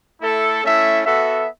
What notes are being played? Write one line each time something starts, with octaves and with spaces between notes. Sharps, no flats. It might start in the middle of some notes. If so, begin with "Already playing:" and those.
A3 E4 A4
A3 C#4 E4 A4 E5
B3 F#4 A4 E5